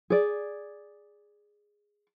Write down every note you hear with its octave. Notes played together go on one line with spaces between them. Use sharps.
G#4 D5